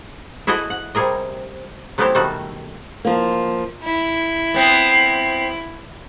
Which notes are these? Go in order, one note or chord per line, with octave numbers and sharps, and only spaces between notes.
E4 F#4 G#4 A4 D#5 F#5
F#5
C3 G3 G#4 A#4 D#5
F#3 A3 B3 C4 E4 G4
B2 D#3 G3 A3 F#4 A4
F3 A#3
E4
B3 C4